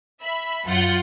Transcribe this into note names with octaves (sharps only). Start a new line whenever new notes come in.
E5 B5
F#2 F4 F#5 G6